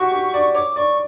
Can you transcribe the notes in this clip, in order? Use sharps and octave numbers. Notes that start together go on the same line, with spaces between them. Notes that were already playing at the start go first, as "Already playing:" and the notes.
Already playing: F#4 G4 C#6
G4
D5
C#5 D6
D5 C#6